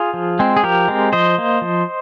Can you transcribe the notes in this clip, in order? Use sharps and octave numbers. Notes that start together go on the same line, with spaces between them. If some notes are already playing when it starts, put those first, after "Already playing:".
Already playing: F4 G#4
F3
G#3 C4
G#4
F3 G4 A#4
G#3 C4
F3 C5 D#5
A#3
F3